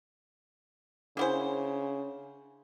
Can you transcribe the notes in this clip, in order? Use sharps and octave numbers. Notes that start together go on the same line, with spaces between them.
C#3 A#3 D4 E4 C5 F#5 G#5